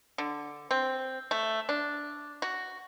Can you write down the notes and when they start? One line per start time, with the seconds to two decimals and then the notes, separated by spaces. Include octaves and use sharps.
0.18 D3
0.71 C4
1.31 A3
1.69 D4
2.42 F#4